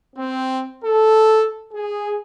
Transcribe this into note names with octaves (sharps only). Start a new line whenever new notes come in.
C4
A4
G#4